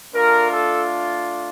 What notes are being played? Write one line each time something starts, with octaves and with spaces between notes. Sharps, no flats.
A3 D4 F4 A#4
A4